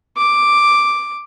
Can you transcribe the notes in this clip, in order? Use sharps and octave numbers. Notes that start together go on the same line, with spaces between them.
D6